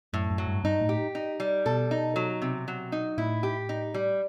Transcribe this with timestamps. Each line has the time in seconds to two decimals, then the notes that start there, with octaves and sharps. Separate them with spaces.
0.13 F#2 A2
0.31 F#2
0.38 F#3
0.47 G2
0.64 G2 D#4
0.81 A2
0.89 G4
1.15 D#4
1.40 G3
1.66 B2 A4
1.91 D#4
2.16 F#3
2.42 C3
2.68 F#3
2.92 D#4
3.18 A2 E4
3.43 G4
3.69 D#4
3.94 G3